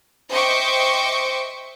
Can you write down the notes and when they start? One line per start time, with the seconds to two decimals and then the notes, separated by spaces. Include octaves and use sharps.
0.31 C5 D#5 E5 G5 C#6 D6